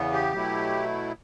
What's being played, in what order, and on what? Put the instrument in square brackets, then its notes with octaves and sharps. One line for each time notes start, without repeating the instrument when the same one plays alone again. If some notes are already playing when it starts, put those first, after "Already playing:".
Already playing: [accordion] E2 C#3 E3 B3
G4
B2 F#3 A3 E4